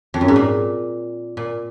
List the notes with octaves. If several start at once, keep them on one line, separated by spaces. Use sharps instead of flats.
F2
F#2
G#2
A#2
A#2